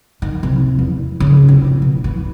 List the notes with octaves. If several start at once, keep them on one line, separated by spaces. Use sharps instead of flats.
D#3
C3
E2
C#3
F1
B2
E3